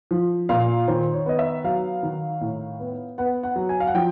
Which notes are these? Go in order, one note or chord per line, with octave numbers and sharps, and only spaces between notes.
F3
A#2 F5
D#3 C5
C#5
B3 D#5
E5
F#3 F5
D#3
A2
B3
B3 F#5
F#5
F#3
G#5
F5
F#5
F3 G5